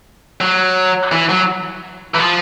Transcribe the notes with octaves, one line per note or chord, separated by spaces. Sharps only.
F#3
E3
F#3
E3
F3